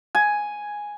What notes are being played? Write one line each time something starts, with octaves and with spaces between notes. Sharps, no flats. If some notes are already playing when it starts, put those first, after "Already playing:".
G#5